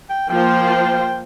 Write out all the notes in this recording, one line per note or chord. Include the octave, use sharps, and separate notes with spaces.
G5
F3 A#3 F4 C5 G5